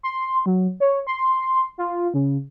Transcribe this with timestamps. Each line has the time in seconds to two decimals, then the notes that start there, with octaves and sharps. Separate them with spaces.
0.03 C6
0.46 F#3
0.80 C#5
1.07 C6
1.78 F4
2.14 C#3